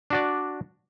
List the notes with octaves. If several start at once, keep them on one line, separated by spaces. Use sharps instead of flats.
D4 F#4 D5